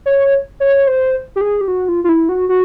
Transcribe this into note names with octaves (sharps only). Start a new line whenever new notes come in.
C#5
C#5
C5
G4
G#4
G4
F#4
F4
F4
E4
F#4
F#4